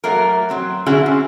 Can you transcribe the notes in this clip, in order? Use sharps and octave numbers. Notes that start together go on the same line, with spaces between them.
F#3 A3 A#3 A#4
F#3 C4
D3 C#4 E4 F#4 G#4
C4